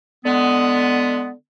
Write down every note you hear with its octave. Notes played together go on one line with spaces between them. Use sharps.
D3 G#3 B3